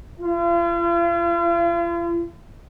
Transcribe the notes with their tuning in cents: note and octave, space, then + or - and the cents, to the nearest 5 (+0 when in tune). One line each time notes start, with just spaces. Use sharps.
F4 -40